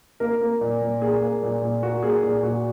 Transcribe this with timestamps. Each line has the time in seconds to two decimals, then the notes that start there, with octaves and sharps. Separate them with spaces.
0.20 A#3 A#4
0.41 A#3
0.61 A#2
0.81 A#2
1.01 A#3 G#4
1.21 A#3
1.43 A#2
1.62 A#2
1.82 A#3 F#4
2.03 A#3 G#4
2.23 A#2 G#4
2.43 A#2 F#4